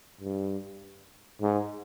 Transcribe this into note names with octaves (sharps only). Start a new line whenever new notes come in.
G2
G#2